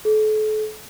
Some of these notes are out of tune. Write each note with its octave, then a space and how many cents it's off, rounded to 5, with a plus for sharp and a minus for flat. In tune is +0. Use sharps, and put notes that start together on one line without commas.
A4 -40